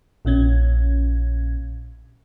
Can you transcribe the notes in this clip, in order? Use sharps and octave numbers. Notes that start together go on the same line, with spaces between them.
A#1 A#2 C#4 G#6